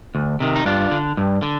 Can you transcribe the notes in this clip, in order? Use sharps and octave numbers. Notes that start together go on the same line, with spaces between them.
D2
C3 D#3
D#4
G2 D4 F4
D3
G2
D3